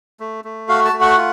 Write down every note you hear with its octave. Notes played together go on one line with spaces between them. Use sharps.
A3
A3
F#4 F5
A5
A3
F#5
F4